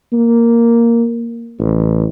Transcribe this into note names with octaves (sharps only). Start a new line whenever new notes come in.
A#3
A1